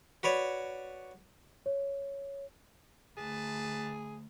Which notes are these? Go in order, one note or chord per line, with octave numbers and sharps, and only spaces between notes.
F#4 B4 C#5 D5
C#5
D2 G#4 B4 A5